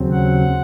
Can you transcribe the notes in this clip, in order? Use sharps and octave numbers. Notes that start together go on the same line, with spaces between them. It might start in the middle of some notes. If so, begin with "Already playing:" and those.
Already playing: D#2 C#3 F#3 C4
F#5